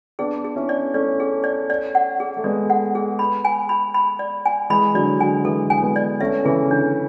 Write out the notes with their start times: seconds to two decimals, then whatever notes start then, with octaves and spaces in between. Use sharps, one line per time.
0.19 B3 D4 G#4
0.44 G#4
0.56 C#4 E4
0.69 D5
0.94 A3 C#4 D5
1.20 G#4
1.44 D5
1.70 D5
1.95 F#5
2.20 G#4
2.37 A3
2.44 G#3 B3 D5
2.70 F#5
2.95 G#4
3.19 B5
3.45 G#5
3.69 B5
3.94 B5
4.19 D5
4.46 G#5
4.70 E3 G#3 B5
4.94 D3 F#3 D5
5.20 D3 F#3 G#5
5.45 E3 G#3 A4
5.70 G#5
5.82 G#3 B3
5.96 D5
6.20 A3 C#4 E5
6.45 C#3 E3 G#4
6.70 D3 D4